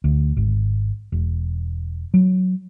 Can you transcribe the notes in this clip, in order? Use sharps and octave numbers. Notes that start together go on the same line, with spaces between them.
D2
G#1
E1
F#3